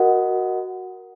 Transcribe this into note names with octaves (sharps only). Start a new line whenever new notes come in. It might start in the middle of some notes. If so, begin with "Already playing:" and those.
Already playing: F#4 A#4 D#5 F#5